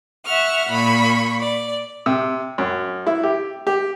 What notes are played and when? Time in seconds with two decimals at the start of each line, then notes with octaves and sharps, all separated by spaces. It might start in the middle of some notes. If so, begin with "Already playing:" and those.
0.25 E5 F#5 C#6 F6
0.69 A#2 B5 C#6
1.39 D5
2.06 C3
2.58 F#2
3.07 E4
3.23 G4
3.67 G4